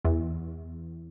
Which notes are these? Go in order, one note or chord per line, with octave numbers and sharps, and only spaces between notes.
E2